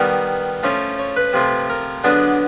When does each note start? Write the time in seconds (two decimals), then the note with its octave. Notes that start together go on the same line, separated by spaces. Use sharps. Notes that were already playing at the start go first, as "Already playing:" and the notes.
Already playing: D#3 G3 B3 A#4
0.63 F3 A3 C#4 C#5
0.99 C#5
1.16 B4
1.33 C3 F3 A3
1.70 A#4
2.04 D3 F#3 B3 D4 G#4